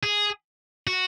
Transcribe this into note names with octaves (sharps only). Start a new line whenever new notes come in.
G#4
F#4